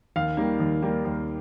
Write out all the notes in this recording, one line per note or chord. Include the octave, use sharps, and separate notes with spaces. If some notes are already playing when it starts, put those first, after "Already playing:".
D#2 F5
D#3 G3 A#3
D#2
D#3 G3 A#3
D#2